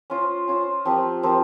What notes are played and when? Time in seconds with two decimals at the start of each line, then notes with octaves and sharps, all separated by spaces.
0.10 C#4 F4 C5
0.48 C#4 F4 C5
0.85 F3 C4 G4 A#4
1.23 F3 C4 G4 A#4